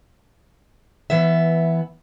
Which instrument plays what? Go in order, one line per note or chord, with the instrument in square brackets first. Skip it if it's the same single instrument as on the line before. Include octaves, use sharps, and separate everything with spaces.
[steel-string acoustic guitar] E3 B3 E5